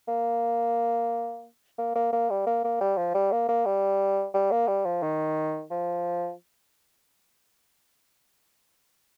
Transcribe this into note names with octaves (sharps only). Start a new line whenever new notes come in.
A#3
A#3
A#3
A#3
G3
A#3
A#3
G3
F3
G3
A#3
A#3
G3
G3
A#3
G3
F3
D#3
F3